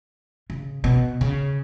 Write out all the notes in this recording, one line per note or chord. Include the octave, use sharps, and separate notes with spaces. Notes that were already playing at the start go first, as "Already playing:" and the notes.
C#3
B2
C#3